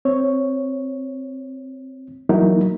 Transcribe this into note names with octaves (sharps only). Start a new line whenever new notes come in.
C4 C#5
E3 F#3 A#3 D#4 E4 A#4